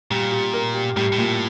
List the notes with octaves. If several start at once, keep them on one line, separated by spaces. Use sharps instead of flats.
A#2 G3
G4
A#4
G4
A2 G3
A2
A#2